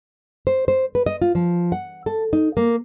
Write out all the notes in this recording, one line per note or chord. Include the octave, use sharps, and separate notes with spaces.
C5
C5
B4
D#5
F4
F3
F#5
A4
D#4
A#3